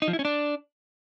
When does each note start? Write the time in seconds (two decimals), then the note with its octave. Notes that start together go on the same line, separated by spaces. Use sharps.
0.02 D#4
0.08 F3
0.13 E4
0.19 C#4
0.25 D4